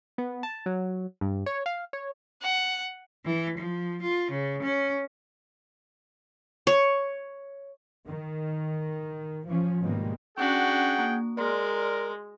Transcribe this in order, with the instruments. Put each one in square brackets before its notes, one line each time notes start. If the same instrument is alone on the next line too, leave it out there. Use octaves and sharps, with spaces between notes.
[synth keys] B3
A5
F#3
G2
C#5
F5
C#5
[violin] F#5
[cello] E3
F3
F4
C#3
C#4
[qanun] C#5
[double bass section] D#3
F3 C#4
G#2 B2 D#3 G3 G#3 A#3
[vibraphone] C#4 [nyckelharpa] D4 F#4 [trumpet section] G#4 F#5 G5
[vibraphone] A#3
[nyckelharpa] G#3 [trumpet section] A#4 [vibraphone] D5 C6